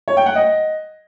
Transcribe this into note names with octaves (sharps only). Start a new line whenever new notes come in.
C#5
G5
F#5
D#5